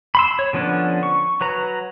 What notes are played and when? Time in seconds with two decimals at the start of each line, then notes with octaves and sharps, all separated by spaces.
0.15 B5 C6 E6
0.39 C#5
0.53 D3 F3 B3 C#4 D4
1.03 C#6
1.41 F#3 B4 A#5